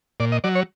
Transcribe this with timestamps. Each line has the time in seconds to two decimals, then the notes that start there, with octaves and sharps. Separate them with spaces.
0.20 A#2 D5
0.32 D#5
0.44 F#3 D5
0.55 C#5